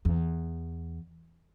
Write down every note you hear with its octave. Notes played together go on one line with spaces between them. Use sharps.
E2